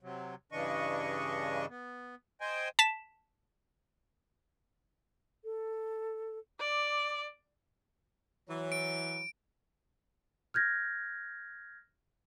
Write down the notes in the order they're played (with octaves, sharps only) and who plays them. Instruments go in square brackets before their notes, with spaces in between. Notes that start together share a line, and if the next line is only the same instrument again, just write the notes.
[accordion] C3 F#3
G2 C#3 E3 D4 D#5 C#6
B3
C5 D#5 G5 G#5
[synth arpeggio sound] A5 B6 E7
[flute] A4
[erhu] D5 [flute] D6
[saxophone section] E3 F#3
[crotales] D7
[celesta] F6 G6 G#6 A#6